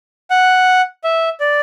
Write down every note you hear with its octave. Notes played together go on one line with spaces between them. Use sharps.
F#5
E5
D5